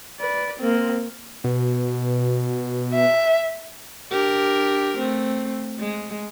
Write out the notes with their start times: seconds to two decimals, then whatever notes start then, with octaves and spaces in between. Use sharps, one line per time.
0.20 B4 D5
0.59 A#3 C4
1.44 B2
2.94 E5
4.11 D4 G4 A#4
4.97 A3 C4
5.79 G#3